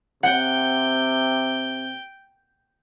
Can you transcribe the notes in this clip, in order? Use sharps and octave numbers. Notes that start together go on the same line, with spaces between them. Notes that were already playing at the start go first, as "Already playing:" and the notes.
C3 F#5 G5